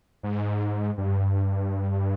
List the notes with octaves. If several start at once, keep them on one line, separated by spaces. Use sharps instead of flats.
G#2
G2